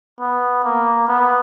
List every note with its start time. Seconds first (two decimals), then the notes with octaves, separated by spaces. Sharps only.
0.20 B3
0.64 A#3
1.08 B3